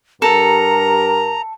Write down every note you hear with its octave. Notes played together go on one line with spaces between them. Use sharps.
G2 G4 A4 A#4 A#5